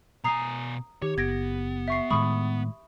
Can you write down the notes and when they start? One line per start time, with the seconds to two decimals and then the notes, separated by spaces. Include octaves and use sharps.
0.24 B2 G#5 A#5 D#6 C7
1.02 D#3 G4 C#5
1.18 F#1 B3 G#6 A#6 D7
1.88 E5 C#6 C7
2.11 A2 D#3 G#3 B5 C#6 D#6